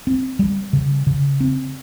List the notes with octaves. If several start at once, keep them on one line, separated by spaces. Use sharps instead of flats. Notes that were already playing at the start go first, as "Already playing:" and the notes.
C4
G3
C#3
C#3
C4